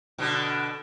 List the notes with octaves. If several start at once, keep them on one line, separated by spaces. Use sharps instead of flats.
B2 D3 D4